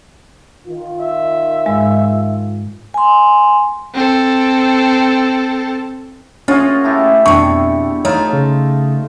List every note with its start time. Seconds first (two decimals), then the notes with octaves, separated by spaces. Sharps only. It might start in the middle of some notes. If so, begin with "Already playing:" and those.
0.67 D#3 F4
1.00 E5
1.66 G#2 G#3
2.94 G#5 C6
3.94 C4 A4
6.48 A#3 C#4 F4 F#4 G#4
6.84 A3 E4 G4
7.26 F2 B2 D4 C#6
8.05 A3 D#4 F4 C#5
8.33 C#3